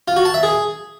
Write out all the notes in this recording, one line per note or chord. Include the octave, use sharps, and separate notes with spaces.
F4
F#4
A5
E5
G#4